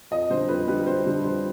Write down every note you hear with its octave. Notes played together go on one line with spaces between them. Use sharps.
F2 D#5
D3 G3 C5
F2 B4
D3 G3 B4
F2 C5
D3 G3
F2 C5